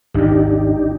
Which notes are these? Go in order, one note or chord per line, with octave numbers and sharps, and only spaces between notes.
G#1 D#2 D4 D#4 G4